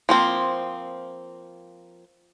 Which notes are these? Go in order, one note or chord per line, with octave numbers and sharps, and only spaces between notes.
F3 A#3 C4